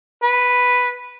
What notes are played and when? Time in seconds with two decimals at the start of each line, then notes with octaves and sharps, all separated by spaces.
0.23 B4